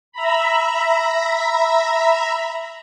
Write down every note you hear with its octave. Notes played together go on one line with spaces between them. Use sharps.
E5 A#5 B5